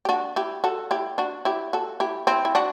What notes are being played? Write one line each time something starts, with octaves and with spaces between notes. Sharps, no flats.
G4
D4 F#4
E4 G4
F#4 A4
E4 G4
D4 F#4
E4 G4
F#4 A4
E4 G4
C4 E4
E4
D4 F#4